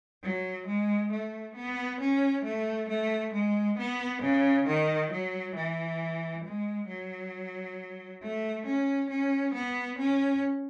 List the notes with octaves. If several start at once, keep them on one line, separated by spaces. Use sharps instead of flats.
F#3
G#3
A3
B3
C#4
A3
A3
G#3
B3
C#3
D#3
F#3
E3
G#3
F#3
A3
C#4
C#4
B3
C#4